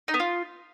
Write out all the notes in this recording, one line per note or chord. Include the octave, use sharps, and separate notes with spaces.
D#4
B3
F4